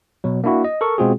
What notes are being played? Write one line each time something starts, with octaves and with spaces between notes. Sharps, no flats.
B2 F#3
A#3 D4 E4 F#4
D#5
A4 A#4 C#6
B2 G#3 C4 F4 F#4 G#4